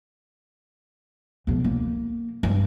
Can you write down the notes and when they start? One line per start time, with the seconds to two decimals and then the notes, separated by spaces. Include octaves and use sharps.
1.47 B1 F3
1.64 A#3
2.43 G2